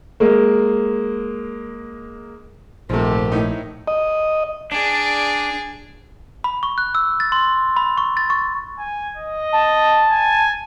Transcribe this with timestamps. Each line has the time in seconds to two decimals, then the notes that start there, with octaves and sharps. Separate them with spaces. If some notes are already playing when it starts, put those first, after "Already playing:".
0.20 G#3 A#3
2.90 A#1 G#2 C3 D#3 F3 A3 G4
3.32 A2 D#4
3.88 D#5
4.72 D4 G#4 D5
6.44 B5
6.63 C#6
6.78 F#6
6.95 E6
7.20 A6
7.32 C6
7.77 B5
7.98 C#6
8.17 A6
8.30 C#6
8.78 G#5
9.16 D#5
9.53 A5
10.10 G#5